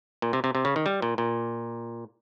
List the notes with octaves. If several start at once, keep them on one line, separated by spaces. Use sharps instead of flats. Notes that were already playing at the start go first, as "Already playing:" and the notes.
A#2
C3
C3
C3
C#3
D#3
G3
A#2
A#2